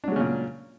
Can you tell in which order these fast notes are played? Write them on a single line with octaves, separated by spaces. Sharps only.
D4 F#3 G#3 C#3 A#2